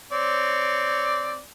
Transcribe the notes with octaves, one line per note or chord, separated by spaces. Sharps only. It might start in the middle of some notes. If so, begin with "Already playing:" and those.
C4 C#5 D5